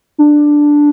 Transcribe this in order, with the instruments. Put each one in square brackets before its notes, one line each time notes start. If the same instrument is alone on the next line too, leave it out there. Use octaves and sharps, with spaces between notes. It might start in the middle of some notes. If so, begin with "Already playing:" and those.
[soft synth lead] D4